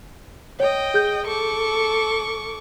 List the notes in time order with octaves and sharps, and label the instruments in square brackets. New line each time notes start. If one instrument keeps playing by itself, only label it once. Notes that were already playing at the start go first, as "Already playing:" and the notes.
[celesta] C#5 [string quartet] D#5 G5
[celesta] G#4 G6
[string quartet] A4 C#6 D6